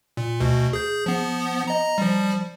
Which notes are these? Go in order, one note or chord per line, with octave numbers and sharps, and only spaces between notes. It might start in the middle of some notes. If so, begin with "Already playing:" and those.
A#2
D2 B2
G#4 G6
F3 B3
D#5 A#5
F3 G3